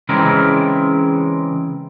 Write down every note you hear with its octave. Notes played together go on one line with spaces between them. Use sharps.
C#3 E3 G#3 C4 G#4 A#4